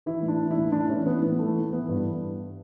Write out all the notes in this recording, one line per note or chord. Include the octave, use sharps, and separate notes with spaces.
E3 E4
A2
D4
E3
E4
A2
A2 D4
E3 C#4
E3 B3
A2 B3
E3 A3
E3
E3 B3
G2